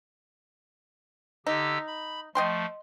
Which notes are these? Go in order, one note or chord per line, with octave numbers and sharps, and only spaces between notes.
D3 D#4 G4 E6
B5
F3 A3 D#5 G5 C6